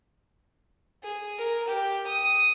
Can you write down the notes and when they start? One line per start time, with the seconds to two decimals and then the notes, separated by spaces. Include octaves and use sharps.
1.03 G#4
1.38 A#4
1.68 G4
2.07 D#6